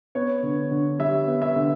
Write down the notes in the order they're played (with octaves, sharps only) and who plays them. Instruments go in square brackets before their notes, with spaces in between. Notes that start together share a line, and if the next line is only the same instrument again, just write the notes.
[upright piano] B3 C#5
D3
D3
G3 E5
B3
E5
D3